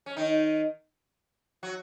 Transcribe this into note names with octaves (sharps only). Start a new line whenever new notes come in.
C#4
D#3 D#4
F#3 F#4